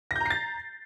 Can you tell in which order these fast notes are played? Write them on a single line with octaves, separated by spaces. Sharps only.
A#6 G6 A#5 C7 A6